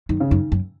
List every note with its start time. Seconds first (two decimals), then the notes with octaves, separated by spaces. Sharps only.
0.09 F#2 D#3
0.20 C#3
0.30 F#2 D#3
0.52 F#2